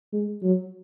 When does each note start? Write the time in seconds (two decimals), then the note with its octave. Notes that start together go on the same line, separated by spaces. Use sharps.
0.13 G#3
0.43 F#3